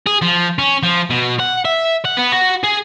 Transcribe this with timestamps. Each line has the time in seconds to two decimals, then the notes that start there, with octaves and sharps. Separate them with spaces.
0.06 G#4
0.22 F3
0.59 C#4
0.83 F3
1.10 B2
1.39 F#5
1.65 E5
2.05 F#5
2.17 B3
2.32 F#4
2.64 G#4